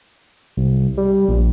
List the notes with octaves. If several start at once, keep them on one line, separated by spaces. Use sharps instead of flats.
C2
G3
A#1